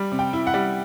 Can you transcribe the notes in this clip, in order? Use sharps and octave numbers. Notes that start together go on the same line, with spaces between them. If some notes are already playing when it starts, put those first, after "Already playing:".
Already playing: G3
C3
G5
E4
F#5
G3